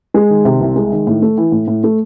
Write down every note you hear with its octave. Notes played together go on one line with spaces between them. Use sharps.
G#3
D#3
C3
C2
G#3
D#3
A2
A3
E3
A2
A2
A3